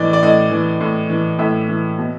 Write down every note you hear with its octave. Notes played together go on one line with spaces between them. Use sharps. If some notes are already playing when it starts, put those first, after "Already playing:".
Already playing: A2 E3 D5 D#5
D5
A2 D#5
E3
A2
E3
A2 E5
E3
B2